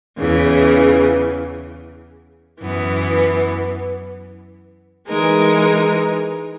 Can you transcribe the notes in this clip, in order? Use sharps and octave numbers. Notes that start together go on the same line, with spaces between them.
E2 C#3 E3
F#2 E3 B3
E3 G#3 D#4 A#4